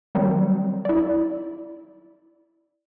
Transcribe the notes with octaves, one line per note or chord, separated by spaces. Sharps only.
D#3 F#3 G3 C4
E4 D5